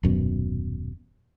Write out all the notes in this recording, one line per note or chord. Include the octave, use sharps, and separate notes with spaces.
D#1 F#2 B2